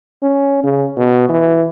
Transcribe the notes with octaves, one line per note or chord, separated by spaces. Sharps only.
C#4
C#3
B2
E3